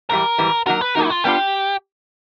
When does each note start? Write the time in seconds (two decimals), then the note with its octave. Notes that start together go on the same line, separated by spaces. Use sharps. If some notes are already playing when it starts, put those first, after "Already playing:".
0.10 G#2 E3 G3 A#4
0.38 G#2 E3 G3
0.66 F#3 A#3 D#4 F#4 A#4
0.81 B4
0.95 F#3 A#3 D#4 F#4 A#4
1.05 E4
1.10 F4
1.24 G3 B3 D4 F4 G4